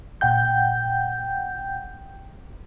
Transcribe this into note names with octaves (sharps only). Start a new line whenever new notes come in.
A#2 F#5 G5 G6